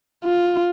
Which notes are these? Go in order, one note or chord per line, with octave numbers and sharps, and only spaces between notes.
F4